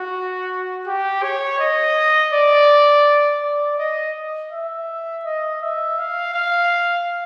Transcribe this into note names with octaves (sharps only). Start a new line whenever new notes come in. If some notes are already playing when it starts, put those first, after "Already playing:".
Already playing: F#4
G4
C#5
D#5
D5
D5
D#5
E5
D#5
E5
F5
F5